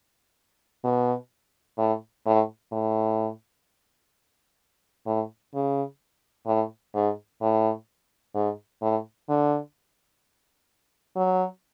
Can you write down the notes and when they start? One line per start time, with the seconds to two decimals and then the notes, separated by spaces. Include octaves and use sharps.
0.84 B2
1.78 A2
2.26 A2
2.72 A2
5.06 A2
5.54 C#3
6.47 A2
6.94 G#2
7.42 A2
8.35 G#2
8.82 A2
9.29 D3
11.16 F#3